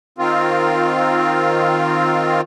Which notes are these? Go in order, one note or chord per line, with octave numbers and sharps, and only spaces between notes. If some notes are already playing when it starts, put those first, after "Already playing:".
D#3 C4 F4